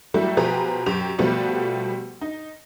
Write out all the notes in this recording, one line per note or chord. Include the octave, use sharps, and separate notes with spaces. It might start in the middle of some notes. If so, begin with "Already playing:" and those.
F#3 G3 A3 E4
B2 F3 G4 G#4 B4 A#5
F#2 G4 F7
B2 F3 G3 A3 B3
D#4